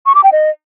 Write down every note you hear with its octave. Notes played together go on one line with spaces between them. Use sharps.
C#6
D6
G5
D#5